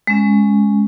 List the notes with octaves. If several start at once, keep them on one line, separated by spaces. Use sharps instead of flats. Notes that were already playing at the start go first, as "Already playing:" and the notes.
G#3 C#4